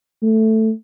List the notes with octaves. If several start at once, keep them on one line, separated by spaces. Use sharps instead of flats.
A3